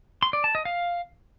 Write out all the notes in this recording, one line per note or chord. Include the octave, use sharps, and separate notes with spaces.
C6
D5
A5
D#5
F5